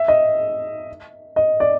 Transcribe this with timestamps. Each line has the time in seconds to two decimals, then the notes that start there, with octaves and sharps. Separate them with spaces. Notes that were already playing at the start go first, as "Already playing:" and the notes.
Already playing: E5
0.08 D#5
1.36 D#5
1.60 D5